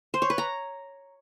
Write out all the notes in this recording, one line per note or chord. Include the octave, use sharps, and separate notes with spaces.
C5
C#5
B4
A#5